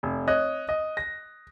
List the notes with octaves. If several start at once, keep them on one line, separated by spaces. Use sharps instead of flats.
F1
C#5 D#5 F#6
D#5
A#6